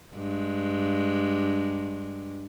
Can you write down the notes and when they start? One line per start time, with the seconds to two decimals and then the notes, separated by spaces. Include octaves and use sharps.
0.16 G2 G#3